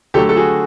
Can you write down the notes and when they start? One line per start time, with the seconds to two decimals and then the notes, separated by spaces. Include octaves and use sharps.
0.14 D3 F#3 A3 G4 A4
0.29 A4
0.37 F#4 G#4